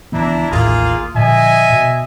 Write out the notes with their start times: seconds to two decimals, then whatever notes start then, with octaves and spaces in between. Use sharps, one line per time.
0.12 C#2 E3 B3 D4 E4 A#5
0.51 A1 D#2 A2 A#3 F4 G#4
1.15 A#2 D3 F3 D#5 E5 G#5
1.70 B2